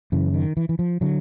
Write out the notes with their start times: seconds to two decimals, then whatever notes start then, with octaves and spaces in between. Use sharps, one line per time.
0.12 F#2 C#3 E3
0.34 D#3
0.57 E3
0.69 E3
0.79 F3
1.01 D3 F#3